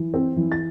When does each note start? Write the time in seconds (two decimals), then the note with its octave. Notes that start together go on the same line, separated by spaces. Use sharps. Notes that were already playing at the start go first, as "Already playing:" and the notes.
Already playing: E3
0.14 C4
0.37 E3
0.52 A6